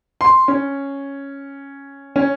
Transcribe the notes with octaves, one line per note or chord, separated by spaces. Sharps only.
C6
C#4
C#4